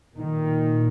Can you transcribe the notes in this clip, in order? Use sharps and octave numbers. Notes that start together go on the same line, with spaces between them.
A#2 D#3